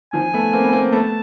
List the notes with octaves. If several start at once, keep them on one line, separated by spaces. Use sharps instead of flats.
D#3 F3 G#5
A3 B3
A#3 C4
B3
A#3 C4
A3 B3 A5